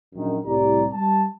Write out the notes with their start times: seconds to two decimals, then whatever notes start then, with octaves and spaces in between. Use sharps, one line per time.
0.14 A#1 F#2 D#3
0.46 C2 A2 G3 G4 D5 A#5
0.93 G3 A5